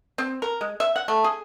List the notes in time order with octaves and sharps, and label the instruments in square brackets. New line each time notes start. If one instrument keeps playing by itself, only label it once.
[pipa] C4
A#4
G#3
E5
F#5
A3
G#4